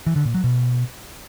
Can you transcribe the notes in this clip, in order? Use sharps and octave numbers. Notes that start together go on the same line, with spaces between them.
E3
D3
A#2
F#3
B2